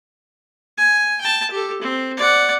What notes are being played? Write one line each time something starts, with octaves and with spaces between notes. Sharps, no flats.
G#5
G5 A5
G4 A4
C4
D5 F#5